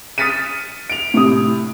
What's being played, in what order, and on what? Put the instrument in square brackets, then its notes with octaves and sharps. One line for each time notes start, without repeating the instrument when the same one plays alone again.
[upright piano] D#6 F6 A6 B6 C#7 D#7
D7 F7
A2 C3 D#6